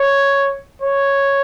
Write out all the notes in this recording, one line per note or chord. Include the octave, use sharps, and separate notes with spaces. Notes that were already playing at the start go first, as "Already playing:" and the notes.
Already playing: C#5
C#5